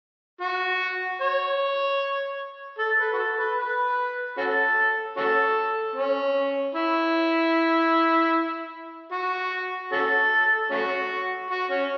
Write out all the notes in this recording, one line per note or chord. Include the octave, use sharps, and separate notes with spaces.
F#4
C#5
A4
B4
F#4
A4
B4
B4
C#4 F#4 A4
C#4 F#4 A4
C#4
E4
F#4
C#4 F#4 A4
A3 C#4 F#4
F#4
C#4